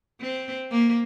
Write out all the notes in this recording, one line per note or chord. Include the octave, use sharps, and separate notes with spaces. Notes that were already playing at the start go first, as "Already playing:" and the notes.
C4
A#3